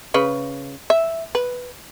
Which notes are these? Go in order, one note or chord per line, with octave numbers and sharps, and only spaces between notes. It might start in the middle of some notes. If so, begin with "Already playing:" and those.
C#3 B4
E5
B4